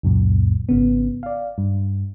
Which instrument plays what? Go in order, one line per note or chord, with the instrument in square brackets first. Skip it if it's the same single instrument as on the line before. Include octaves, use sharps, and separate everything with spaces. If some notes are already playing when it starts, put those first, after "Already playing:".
[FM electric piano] C#2 F#2 A#2
G#1 C#3 B3
D5 F5
G2